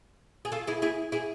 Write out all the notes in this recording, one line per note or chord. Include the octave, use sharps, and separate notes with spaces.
G#4
F4 A4
E4 G#4
E4 G#4
E4 G#4